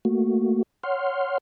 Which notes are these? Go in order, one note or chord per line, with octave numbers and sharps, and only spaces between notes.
A3 A#3 F#4
C#5 F#5 C6 F6